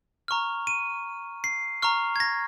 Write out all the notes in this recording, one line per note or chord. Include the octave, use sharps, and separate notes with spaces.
A#5 C#6 F6
D#7
C7
A#5 C#6 F6
G#6
A#6